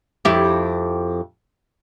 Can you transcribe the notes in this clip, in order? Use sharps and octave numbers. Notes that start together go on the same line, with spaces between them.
F2 E4 G4